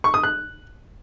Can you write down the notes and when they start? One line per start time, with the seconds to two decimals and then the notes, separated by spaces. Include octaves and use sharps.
0.04 C#6
0.14 D#6
0.23 F#6